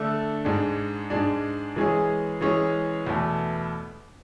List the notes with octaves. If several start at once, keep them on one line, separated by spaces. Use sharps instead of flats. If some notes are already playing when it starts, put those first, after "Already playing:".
Already playing: D3 A3 D4 A4
G#2 G#3 D4
G#2 G#3 D4
E3 G#3 C#4 G#4
E3 G#3 C#4 G#4
E2 B2 A3